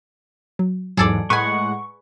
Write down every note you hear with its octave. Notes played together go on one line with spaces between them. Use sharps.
F#3
E2 G#2 F#3 G#4 A4 D5
A2 G#3 B4 F#5 G#5 C#6